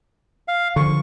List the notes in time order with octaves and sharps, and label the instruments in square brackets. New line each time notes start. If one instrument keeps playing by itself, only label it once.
[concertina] F5
[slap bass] D3 F3 [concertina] C#6